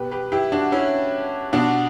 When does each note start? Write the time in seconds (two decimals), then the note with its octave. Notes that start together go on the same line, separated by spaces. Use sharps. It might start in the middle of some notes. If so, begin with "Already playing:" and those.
Already playing: B2 G4 B4
0.11 G4 B4
0.32 E4 G4
0.52 D4 F#4
0.72 C#4 E4
1.53 B2 D4 F#4